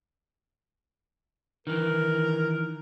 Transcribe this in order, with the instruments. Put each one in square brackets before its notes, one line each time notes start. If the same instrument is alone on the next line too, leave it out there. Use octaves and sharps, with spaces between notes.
[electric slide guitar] D#3 E3 [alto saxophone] A#4